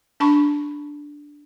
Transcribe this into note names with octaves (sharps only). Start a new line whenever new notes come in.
D4 A5 B5 C#6